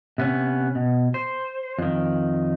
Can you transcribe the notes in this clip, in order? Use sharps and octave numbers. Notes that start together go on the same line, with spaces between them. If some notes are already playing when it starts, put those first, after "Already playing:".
C3 B3 C#4
B2
C5
F2 D#3